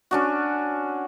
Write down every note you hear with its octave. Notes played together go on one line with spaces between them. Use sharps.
C#4 D4 F#4